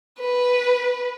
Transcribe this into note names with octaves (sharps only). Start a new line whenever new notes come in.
B4